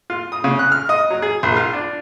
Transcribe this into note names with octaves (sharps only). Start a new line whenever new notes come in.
F4
D#6
C#3
F#6
F6
D#5
F#3
G#4
A#1
F4
D4